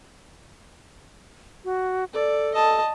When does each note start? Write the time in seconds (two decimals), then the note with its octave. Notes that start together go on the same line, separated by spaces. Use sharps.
1.65 F#4
2.14 A4 D5
2.54 D#5 A5